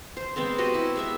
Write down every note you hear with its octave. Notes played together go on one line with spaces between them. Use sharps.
C5
G#3 B3 C4 C5
F#4 G4 D#5
E4
G#3 B3 E5